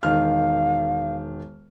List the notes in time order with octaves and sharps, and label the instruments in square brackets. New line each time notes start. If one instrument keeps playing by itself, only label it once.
[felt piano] E1 D#3 F6 [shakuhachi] F5